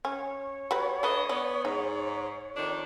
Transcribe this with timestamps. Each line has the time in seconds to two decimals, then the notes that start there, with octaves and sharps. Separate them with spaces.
0.05 C#4 C#5
0.71 G3 F#4 B4
1.03 A3 D4 B4 D#5
1.29 B3 D5
1.65 G#2 D#4
2.56 F2 D#3 D4